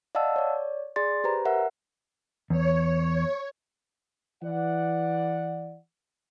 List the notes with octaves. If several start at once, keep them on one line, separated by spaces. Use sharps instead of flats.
D5 D#5 F5 F#5 A5 E6
C#5 D5
G#4 D5 C6 A6
G4 B4 C5 A#5
A#4 E5 F#5
E2 C#5
E3 D5 F#5